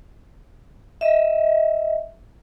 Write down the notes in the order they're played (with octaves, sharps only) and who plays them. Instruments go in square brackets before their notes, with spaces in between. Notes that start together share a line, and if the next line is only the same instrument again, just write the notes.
[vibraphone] D#5 E5